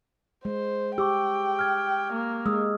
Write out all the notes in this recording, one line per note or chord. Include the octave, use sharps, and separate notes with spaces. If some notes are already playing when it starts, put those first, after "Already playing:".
G#3 C5
G4 G5 C#6 D6 E6
F6 G#6
A#3
G#3 D#6 E6